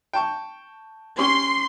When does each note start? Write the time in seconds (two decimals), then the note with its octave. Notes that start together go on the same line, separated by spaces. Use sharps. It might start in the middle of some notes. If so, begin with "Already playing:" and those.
0.13 G5 A5 C#6
1.18 C#4 G4 C6 C#6